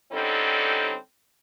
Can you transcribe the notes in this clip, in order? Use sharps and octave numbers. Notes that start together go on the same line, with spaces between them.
D3 G3 C4 C#4 D#4 A4